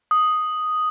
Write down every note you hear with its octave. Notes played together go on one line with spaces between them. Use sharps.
D#6